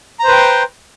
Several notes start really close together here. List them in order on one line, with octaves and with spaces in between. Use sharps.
A#5 C5 B4 G5 C6